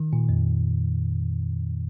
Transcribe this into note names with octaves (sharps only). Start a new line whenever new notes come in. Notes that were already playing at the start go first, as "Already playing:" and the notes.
Already playing: D#3
A#2
F2